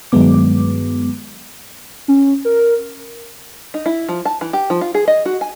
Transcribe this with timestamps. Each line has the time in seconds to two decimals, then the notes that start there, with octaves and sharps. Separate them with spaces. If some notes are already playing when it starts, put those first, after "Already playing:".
0.12 G2 D#3 F#3 G#3 B3 D6
2.08 C#4
2.45 A#4
3.74 D#4
3.86 E4
4.09 F3
4.25 A5
4.41 E3
4.53 G4
4.70 F3
4.81 F4
4.94 G#4
5.08 D#5
5.26 F#4
5.41 G#5